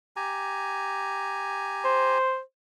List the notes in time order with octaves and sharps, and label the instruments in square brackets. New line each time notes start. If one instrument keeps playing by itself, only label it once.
[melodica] G4 G#5 A#5
[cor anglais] C5